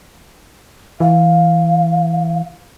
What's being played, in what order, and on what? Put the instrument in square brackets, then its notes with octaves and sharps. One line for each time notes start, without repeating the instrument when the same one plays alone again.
[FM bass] E3 [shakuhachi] F5